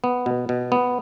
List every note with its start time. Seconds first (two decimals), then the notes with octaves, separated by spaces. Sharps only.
0.04 B3
0.26 B2
0.49 B2
0.72 B3